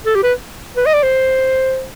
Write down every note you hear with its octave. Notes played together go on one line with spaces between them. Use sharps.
A4
G4
B4
B4
D#5
D5
C5